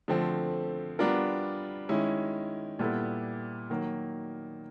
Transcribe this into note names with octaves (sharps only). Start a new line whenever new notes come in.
D3 F3 A3 C4
G3 B3 D4 F4 A#4
D#3 G#3 C#4 E4
A#2 G3 B3 E4 A4
D#3 F#3 A#3